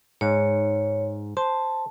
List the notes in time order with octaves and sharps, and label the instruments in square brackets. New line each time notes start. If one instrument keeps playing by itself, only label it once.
[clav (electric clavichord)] G#2 [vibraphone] C#5
[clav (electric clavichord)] C5 [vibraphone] A5